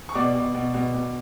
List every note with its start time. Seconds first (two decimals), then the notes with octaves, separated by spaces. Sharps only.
0.09 C#6
0.15 B2 D5 D6
0.35 B2
0.55 B2
0.74 B2
0.94 B2